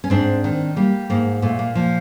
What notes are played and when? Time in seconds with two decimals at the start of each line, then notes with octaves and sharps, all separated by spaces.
0.04 C#4
0.10 G#2 C4 D4
0.44 D#3
0.76 G3 A#3
1.10 G#2 A#3
1.42 A#2 A3
1.59 A#3
1.75 F3